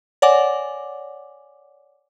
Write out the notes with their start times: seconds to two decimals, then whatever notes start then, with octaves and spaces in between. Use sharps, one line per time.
0.22 C#5 D5 F#5 G#5 D6